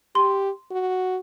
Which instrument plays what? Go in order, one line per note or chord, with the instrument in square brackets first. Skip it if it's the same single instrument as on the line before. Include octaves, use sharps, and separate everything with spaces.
[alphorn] G4 [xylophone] C6
[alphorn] F#4